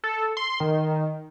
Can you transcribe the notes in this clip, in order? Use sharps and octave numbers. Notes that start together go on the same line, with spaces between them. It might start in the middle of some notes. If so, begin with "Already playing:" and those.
A4
C6
D#3